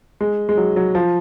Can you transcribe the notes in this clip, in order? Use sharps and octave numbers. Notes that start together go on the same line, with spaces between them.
G#3
G#3
F#3
F#3
F3